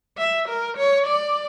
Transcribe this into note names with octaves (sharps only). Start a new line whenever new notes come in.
E5
A#4
C#5
D5